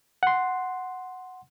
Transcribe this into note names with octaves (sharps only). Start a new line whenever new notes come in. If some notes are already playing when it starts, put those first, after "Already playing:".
F#5 C6